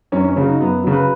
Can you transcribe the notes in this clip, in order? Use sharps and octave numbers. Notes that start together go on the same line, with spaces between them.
F#2 C#4
C#4
C#3 F#3 C#4
D#4
F#2 B3
C#3 F#3
B4